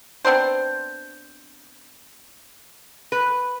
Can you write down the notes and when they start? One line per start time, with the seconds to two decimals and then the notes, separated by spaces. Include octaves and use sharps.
0.25 B3 C4 D4 C5
3.12 B4